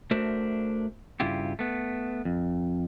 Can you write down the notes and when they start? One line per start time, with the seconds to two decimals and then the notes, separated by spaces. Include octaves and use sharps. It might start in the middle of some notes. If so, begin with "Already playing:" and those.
0.11 A3 D4 F#4 A#4 C5 E5
1.20 G2 C#3 E4 F4 G4
1.59 A3 B3
2.25 F2